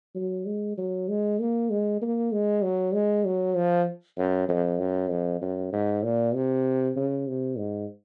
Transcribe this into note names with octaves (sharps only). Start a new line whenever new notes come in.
F#3
G#3
F#3
G#3
A#3
G#3
A#3
G#3
F#3
G#3
F#3
F3
F#2
F2
F#2
F2
F#2
G#2
A#2
C3
C#3
C3
G#2